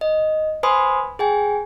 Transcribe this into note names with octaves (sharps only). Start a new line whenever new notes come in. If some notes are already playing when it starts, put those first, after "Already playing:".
D#5
B4 C5 G#5 B5 C6 D#6
G#4 G5 G#5